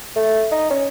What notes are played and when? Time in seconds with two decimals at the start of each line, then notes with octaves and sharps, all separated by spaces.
0.16 A3
0.51 D#4
0.71 C#4